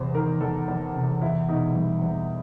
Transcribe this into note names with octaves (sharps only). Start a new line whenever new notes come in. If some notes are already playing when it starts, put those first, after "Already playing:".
Already playing: E2 C3 C5
D#3 A#4
E2 A4
E2
C3
E2 E4
B2 D#4
G3
E2